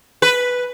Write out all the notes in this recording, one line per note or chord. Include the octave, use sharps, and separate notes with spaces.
B4